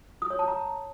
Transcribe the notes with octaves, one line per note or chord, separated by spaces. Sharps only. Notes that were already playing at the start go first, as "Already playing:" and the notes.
D#6
C#5
A5
A#5